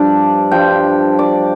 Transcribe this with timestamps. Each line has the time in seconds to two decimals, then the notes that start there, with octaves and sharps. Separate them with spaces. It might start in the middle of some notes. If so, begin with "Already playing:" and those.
Already playing: G2 F3 D4 D5
0.51 G2 F3 G5
1.19 D5